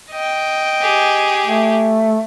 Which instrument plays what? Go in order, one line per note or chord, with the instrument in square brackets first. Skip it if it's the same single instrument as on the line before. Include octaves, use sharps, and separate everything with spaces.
[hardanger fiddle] D#5 G5
[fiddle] G4 G#4
[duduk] A3